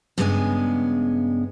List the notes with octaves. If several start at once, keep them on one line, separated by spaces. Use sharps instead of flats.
G2 C#3 G#3 B3 G#5